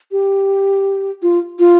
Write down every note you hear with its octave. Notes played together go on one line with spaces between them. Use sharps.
G4
F4
F4